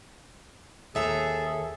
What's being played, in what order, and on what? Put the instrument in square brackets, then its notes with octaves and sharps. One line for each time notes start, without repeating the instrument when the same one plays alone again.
[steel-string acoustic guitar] D#2 E5 A#5 [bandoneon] G#4 A4